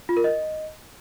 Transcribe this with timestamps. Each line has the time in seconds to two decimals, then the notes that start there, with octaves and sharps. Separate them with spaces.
0.09 F4
0.17 A#4
0.24 D#5